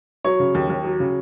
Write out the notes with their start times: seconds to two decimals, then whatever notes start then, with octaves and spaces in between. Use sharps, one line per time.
0.25 F#3 C#5
0.40 C#3
0.55 D#2
0.70 D#2
0.84 F#3
1.00 C#3